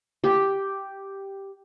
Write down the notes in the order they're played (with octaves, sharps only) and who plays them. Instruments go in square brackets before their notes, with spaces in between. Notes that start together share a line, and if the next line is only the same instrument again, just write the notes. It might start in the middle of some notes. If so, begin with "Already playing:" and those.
[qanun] G4